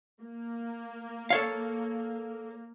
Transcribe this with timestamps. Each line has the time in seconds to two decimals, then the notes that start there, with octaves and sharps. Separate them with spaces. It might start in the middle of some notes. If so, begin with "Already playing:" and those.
0.22 A#3
1.30 A4 C#5 F5